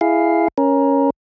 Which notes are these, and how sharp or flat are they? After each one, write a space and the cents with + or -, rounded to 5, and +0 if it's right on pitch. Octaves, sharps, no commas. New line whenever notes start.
E4 +10 G#4 +0 F5 +0
C#4 +0 A#4 +15